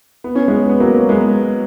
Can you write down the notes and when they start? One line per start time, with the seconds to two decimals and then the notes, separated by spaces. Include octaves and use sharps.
0.24 B3
0.35 C#4
0.48 G#3 B3
0.69 B3
0.80 F#3 A#3
1.09 G#3 B3